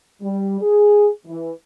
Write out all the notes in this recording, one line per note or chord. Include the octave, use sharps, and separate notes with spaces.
G3
G#4
E3